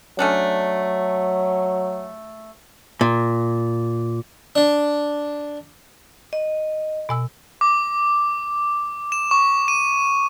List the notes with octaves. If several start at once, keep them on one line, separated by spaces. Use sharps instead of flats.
F#3 A3 C#4 D4
A#2
D4
D#5
B2 G#5 E6
D6
E7
C#6
D#7